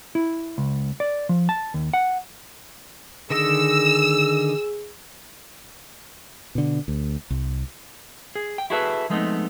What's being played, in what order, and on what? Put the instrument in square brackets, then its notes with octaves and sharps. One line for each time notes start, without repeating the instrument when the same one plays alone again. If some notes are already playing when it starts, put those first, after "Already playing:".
[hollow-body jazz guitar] E4
C#2
D5
F3
A5
D#2
F#5
[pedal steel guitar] D3 D#3 D#5 [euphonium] G#4 [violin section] E6
[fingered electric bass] B2 D3
D2
C2
[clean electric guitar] G#4
G5
E4 F#4 G#4 A4 B4 E5
F3 G#3 A3 B3 C4 D#4